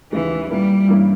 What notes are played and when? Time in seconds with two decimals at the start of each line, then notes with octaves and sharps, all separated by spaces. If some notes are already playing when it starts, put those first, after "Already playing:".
0.12 D#2 C#3 E3 G#3 D#4
0.50 A#2 G3 A#3 E4
0.88 G2 E3 A#3 C#4 E4